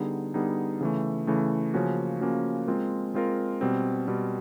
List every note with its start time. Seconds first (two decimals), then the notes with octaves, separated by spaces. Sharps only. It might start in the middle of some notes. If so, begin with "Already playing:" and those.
Already playing: D3 G3 B3 D#4 G#4
0.34 D3 G3 B3 D#4 G#4
0.81 C#3 E3 A3
1.27 C#3 E3 A3
1.74 C#3 F3 A#3 C#4 F#4
2.21 C#3 F3 A#3 C#4 F#4
2.67 G#3 C4 F4 A#4
3.14 G#3 C4 F4 A#4
3.61 B2 G3 C4
4.08 B2 G3 C4